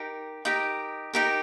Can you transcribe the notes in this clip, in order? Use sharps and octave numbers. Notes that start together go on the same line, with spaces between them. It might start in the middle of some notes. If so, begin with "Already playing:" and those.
Already playing: D#4 G4 A#4
D#4 G4 A#4
D#4 G4 A#4